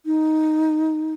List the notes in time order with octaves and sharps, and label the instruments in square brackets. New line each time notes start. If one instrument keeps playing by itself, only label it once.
[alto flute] D#4